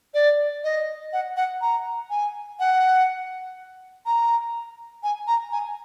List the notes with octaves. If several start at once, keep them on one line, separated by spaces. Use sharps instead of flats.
D5
D#5
F#5
F#5
A#5
G#5
F#5
A#5
G#5
A#5
G#5